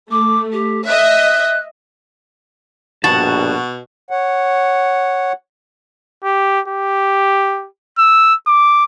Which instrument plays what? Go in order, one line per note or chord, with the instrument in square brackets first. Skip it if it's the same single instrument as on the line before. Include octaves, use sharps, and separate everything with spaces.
[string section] A3 [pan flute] D6
[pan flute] G4
[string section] D#5 E5 [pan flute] F#6
[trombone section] A#1 G2 [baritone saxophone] B2 [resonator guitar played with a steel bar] F#4 [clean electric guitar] A5
[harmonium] C#5 F#5
[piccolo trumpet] G4
G4
E6
D6